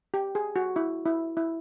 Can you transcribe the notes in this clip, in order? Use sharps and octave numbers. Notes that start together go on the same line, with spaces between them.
G4
G#4
F#4
E4
E4
E4